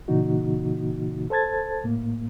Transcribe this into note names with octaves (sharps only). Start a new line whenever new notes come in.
A#2 C#3 E3 A#3 D#4 F#4
A4 C5 A5 G#6 A6
A2 A#3